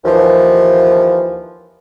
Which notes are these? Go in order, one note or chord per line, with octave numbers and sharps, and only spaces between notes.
D#2 E3 F3